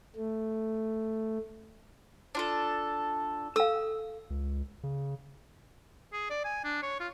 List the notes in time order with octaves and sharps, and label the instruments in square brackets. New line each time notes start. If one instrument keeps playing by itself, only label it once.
[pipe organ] A3
[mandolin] D4 F4 A4
[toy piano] A4 F5 [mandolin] D#6 E6
[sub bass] C#2
C#3
[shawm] G#4
D5
G#5
D4
C#5
F4